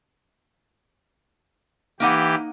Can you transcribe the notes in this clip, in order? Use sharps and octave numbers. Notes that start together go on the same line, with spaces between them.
E3 A#3 D#4 G4 F#5